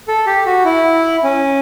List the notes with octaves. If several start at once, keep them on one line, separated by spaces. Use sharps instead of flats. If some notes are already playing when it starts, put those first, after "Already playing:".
A4
G4
F#4
E4
C#4